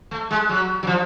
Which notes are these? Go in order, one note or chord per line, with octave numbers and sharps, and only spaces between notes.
A3
G#3
F#3
F#3
F3